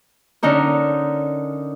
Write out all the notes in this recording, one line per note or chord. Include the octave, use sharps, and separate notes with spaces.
D3 C#4 D#4 A#4